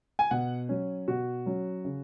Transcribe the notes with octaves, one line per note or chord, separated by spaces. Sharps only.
G#5
B2 F#5
F#3 C#4
B2 F#4
F#3 C#4
C#3